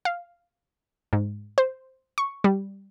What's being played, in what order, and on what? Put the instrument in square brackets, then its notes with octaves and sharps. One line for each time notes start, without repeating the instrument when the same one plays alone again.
[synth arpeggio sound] F5
G#2
C5
C#6
G3